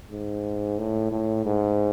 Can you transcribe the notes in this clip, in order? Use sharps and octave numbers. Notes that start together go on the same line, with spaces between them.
G#2
A2
A2
G#2